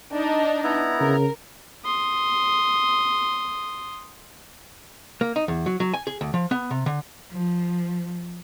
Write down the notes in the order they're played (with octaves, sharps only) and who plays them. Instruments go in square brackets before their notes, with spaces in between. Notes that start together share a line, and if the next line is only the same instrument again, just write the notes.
[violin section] D4 D#4 D#5
[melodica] B3 E4 A#5
[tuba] C#3 [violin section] A#4
[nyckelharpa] C6 D#6
[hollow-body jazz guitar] A#3
D#4
E2
F#3
F#3
G#5
G#4
D2
F3
B3
C3
D3
[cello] F3